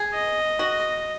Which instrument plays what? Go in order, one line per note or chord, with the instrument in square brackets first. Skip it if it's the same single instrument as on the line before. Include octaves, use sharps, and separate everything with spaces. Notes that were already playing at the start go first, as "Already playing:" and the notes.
Already playing: [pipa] G#4
[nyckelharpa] D#5
[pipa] F#4